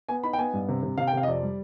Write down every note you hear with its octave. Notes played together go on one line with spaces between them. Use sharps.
B3 G#5
D#4 B5
G5
B3 G#5
G2
C3
C3
C3 F5
G5
C3 F5
D#5
F2 D5
G3